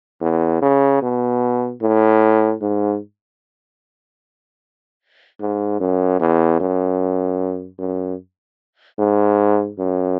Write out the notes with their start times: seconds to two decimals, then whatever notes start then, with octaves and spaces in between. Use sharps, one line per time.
0.21 E2
0.62 C#3
1.02 B2
1.81 A2
2.62 G#2
5.40 G#2
5.80 F#2
6.20 E2
6.60 F#2
7.79 F#2
8.99 G#2
9.79 F#2